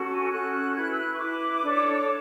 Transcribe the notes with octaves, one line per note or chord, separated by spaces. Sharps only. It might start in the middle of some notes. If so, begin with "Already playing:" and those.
Already playing: C#4 F#4 A4
G#5
C#4 F#4 A4 F#6
E4 B4 G#6
F#6
E6
F#6
C#6
E4 B4 D6
D4 A4 C#5
D6